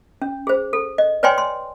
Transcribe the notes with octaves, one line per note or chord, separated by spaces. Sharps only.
C#4
G#4 C5
A4
D#5
B4 C#5 D5 G5 G#5 C6
C6